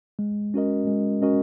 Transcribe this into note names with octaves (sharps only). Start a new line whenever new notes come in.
G#3
C#4 F#4 A#4 D#5
G#3
C#4 F#4 A#4 D#5